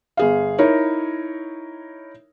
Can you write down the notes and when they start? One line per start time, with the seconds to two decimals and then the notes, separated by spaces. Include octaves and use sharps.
0.17 G1 G#4 F5
0.58 D#4 E4 A#4 C#5